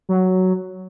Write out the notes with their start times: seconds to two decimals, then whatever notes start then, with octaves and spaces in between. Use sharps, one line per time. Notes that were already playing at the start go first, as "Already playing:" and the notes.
0.09 F#3